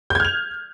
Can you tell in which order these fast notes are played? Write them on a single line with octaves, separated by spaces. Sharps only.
G6 G#6 F6 F7